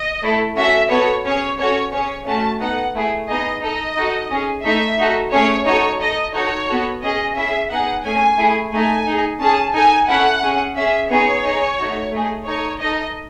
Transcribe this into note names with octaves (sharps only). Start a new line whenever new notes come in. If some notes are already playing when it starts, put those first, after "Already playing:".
Already playing: D#5
A3 E4 A4
C#4 F#4 A4 E5
B3 F#4 A4 C#5
C#4 G#4 C#5
C#4 F#4 A4 C#5
C#4 G#4 C#5
A3 C#4 F#4 A5
B3 D#4 A4 F#5
A3 E4 G#4
B3 D#4 G#4 D#5
D#4 A4 D#5
D#4 F#4 A4
C#4 G#4
A3 D#4 A4 E5
D#4 F#4 A4
A3 C#4 G#4 C#5
D#4 F#4 A4 C#5
D#4 A4 D#5
D#4 F#4 A4 C#5
B3 F#4 A4
C#4 G#4 D#5
C#4 E4 G#4 E5
B3 D#4 G#4 F#5
A3 C#4 G#4 G#5
A3 E4 G#4
A3 D#4 A4 G#5
D#4 G#4
C#4 G#4 A5
D#4 A4 G#5
C#4 E4 A4 F#5
C#4 G#4
C#4 G#4 E5
B3 D#4 G#4 C#5
D#4 G#4
A3 D#4 F#4
A3 D#4 G#4
D#4 A4 C#5
D#4 A4 D#5